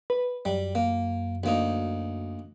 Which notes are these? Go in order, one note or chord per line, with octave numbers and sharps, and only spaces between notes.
B4
F#2 G3
A#3
D2 A#3 D#4